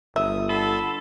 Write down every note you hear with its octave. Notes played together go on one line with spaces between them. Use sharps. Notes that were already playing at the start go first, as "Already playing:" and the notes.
G1 E5 D#6
D3 A4 B5 C6